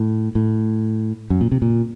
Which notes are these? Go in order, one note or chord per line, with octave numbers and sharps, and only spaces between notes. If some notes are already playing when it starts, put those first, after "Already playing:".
Already playing: A2
A2
F#2
A#2
C3
A#2